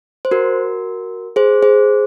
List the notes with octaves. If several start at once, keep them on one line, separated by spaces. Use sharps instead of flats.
C5
F#4 A#4
G#4 C5
G#4 C5